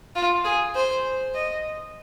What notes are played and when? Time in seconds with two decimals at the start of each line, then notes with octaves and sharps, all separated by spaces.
0.16 F4
0.45 G#4
0.75 C5
1.35 D#5